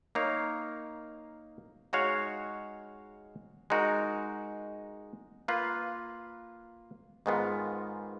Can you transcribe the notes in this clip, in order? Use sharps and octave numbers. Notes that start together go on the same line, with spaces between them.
A#3 D#4 A#4 C#5 F5
G#3 D#4 F#4 C#5 F5
G#3 D#4 F#4 A#4
A#3 F4 B4 F5
G#2 D#3 G#3 B3 F4